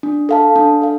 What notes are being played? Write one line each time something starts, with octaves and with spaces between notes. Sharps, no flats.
D4
A4 F5 A5
D4
A4 F5